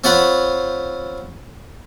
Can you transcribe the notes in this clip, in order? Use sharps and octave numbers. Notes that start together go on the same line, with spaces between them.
C4 F4 C5 C#5 F#5 B5